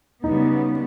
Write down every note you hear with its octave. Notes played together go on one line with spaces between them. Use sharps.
C#3 G3 B3 D#4